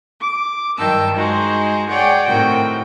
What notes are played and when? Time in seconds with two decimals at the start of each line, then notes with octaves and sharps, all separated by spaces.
0.19 D6
0.77 G2 D#3 F#3 G5 A5 E6
1.15 G#3 D#4 F#4 G#4 C5
1.89 G#4 C#5 D5 F#5 G5
2.26 A2 C3 D#3 F#4 G5